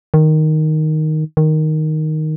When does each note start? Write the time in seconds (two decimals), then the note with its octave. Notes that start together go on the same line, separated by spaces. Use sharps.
0.14 D#3
1.37 D#3